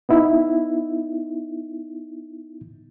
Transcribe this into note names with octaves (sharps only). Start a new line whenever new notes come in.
B3 D#4 E4